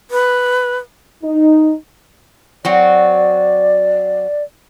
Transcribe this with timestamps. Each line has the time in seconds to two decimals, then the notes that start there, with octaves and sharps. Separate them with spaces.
0.11 B4
1.23 D#4
2.65 F#3 C4 F#4 D5